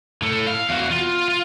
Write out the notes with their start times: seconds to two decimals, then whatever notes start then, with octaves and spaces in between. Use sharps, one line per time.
0.22 A2 A4
0.47 F5
0.69 E2 F#4
0.91 F4
1.28 F4